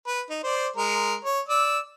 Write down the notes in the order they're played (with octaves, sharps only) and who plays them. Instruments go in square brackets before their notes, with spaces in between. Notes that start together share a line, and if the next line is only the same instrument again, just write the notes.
[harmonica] B4
D#4
C5 D5
G#3 A#4
C#5
D5 E6